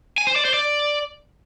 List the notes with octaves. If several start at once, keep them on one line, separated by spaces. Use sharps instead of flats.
G#5
C5
D5
C5
D5